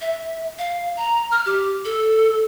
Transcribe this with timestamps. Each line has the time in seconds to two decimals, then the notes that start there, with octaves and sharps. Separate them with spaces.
0.01 E5
0.59 F5
0.97 A#5
1.31 F6
1.46 G4
1.85 A4